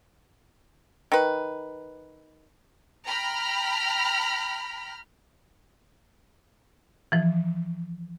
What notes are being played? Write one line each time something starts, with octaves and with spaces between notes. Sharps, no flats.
D#3 B4
G5 A#5 B5 F6
E3 F3